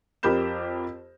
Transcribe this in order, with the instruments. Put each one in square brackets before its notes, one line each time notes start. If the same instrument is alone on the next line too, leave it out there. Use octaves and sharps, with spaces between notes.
[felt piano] F2 G4 A#4 B5 G6 E7